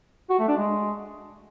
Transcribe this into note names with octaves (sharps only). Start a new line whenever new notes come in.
F#4
A3
D4
G#3